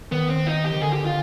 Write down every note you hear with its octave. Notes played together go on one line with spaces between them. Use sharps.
D#3 B3
C4
D#4
G4
D#3
D3 G#4
G4
F4